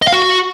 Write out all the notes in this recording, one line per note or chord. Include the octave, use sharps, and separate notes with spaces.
D#5
F5
F#4